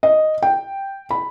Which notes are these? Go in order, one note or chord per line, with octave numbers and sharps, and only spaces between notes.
D#5
G5
B5